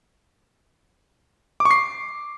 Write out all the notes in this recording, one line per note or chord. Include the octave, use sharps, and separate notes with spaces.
D6
C#6
C7